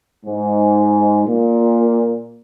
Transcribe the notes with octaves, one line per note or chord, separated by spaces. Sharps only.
G#2
A#2